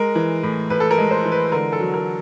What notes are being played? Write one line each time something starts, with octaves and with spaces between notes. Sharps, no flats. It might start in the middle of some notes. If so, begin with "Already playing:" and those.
Already playing: G#3 A#4
E3
A2
A2 B4
A4
A#4
G#3
C5
E3
B4
D3 A#4
A4
F#3
A#4